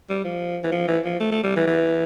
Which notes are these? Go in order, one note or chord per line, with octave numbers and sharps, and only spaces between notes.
G3
F3
E3
F3
E3
F3
A3
A3
G3
E3
E3